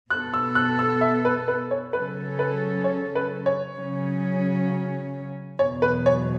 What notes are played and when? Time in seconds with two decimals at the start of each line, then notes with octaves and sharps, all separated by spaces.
0.10 B2 B3 A4 F#6
0.34 E6
0.55 F#6
0.79 E6
1.01 E5
1.25 B4
1.48 B4
1.71 C#5
1.93 C#3 F#3 C#4 A4 B4
2.39 B4
2.84 C#5
3.15 B4
3.46 C#5
3.76 C#3 F#3 C#4
5.59 E2 B2 F#3 C#5
5.82 B4
6.06 C#5